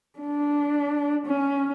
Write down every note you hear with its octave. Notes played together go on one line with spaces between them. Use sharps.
D4
C#4